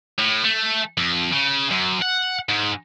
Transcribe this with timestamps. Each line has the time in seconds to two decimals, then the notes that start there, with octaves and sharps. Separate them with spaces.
0.18 A2
0.44 A3
0.97 F2
1.32 C#3
1.71 F#2
2.02 F#5
2.49 G#2